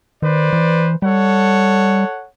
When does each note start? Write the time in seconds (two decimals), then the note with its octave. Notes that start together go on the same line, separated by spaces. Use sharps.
0.22 D#3 B4 C5 D5
0.53 E3
1.02 G3 A4 C#5 F#5